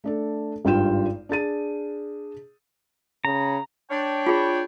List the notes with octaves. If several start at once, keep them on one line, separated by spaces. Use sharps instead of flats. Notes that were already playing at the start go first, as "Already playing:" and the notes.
A3 D4 A4
G#1 G2 F4 G5 E7
D4 G#4 A6 D#7
C#3 A#5
D4 C#5 G5
F4 G#4 B5